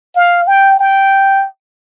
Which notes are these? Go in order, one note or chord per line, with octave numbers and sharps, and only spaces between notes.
F5
G5
G5